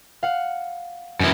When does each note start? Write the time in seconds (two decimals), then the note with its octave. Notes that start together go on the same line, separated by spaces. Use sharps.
0.23 F5 F#5
1.20 F#2 E3